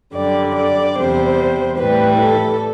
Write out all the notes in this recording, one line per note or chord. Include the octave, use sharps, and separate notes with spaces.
F#2 D3 G3 D5
D5
E2 C3 G3 C5
A2 E3 G3 B4
A4